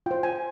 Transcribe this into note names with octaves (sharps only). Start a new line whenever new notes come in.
F4 C5 G5
G#5